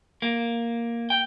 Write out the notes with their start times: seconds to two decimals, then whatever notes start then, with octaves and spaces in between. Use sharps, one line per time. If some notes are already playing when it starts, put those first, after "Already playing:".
0.22 A#3
1.10 G5